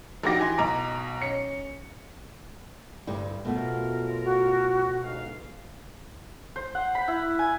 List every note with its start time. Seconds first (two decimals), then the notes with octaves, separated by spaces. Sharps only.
0.23 A#1 D#3 F#4 G4 D6 A#6
0.39 E3 G#5 C6
0.58 B1 B2 A#5 D6
1.21 C#4 C#7
3.07 D2 G2 G3
3.45 F#2 B2 A3 B3 F4 A#4
4.24 F#4
5.02 G1 G#2 F5
6.56 C5
6.75 F#5
6.95 B5
7.08 E4
7.39 G#5